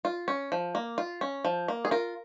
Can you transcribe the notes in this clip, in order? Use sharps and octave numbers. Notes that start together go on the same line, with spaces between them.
F4
C#4
F3
A#3
F4
C#4
F3
A#3
G#4
F4 A#4